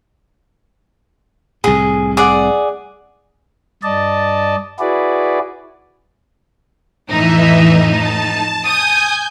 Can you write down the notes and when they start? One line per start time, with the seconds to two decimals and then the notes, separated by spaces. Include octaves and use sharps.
1.64 C2 A2 G#4
2.17 G#4 D5 F#5
3.83 G2 D5 D#5 A5
4.79 E4 F#4 G#4 B4 D5
7.08 F2 A2 E3 D#4 E5
7.90 A5
8.64 G#5 D#6 G6